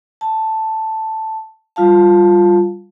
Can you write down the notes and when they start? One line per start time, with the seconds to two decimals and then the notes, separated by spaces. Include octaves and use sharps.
0.21 A5
1.76 G3 F4 F5 A5